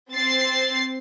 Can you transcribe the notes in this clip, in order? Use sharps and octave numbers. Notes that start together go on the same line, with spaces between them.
C4 A6 C7